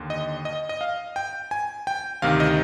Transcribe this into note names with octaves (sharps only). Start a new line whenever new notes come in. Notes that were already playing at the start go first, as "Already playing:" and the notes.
Already playing: D#2 D3
D#5
D#5
D#5
F5
G5
G#5
G5
D2 C3 D#3 F5
D#5